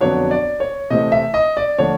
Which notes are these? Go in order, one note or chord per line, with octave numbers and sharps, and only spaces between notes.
F2 D3 F#3 B3 D4 C#5
D5
C#5
C3 E3 A3 C4 D#5
E5
D#5
D5
D3 F3 A3 D4 C#5